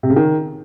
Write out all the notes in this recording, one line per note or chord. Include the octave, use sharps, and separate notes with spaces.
C3
C#3
D#3